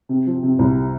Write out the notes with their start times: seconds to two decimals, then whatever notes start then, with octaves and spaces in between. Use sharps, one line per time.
0.09 C3
0.27 F3
0.43 C3
0.59 C2